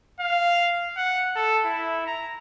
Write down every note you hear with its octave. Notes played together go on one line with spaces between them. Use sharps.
F5
F#5
A4
E4
A#5